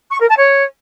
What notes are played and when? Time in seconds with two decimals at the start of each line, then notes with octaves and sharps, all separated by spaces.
0.10 C#6
0.19 A#4
0.28 A5
0.38 C#5